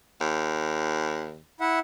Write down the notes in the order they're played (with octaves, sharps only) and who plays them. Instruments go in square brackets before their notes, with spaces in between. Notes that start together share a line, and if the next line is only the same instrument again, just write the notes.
[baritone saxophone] D#2
[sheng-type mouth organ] E4 E5 F#5